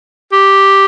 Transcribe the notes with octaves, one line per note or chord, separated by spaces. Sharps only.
G4